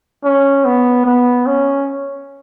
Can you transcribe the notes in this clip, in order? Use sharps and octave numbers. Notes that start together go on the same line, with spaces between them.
C#4
B3
B3
C#4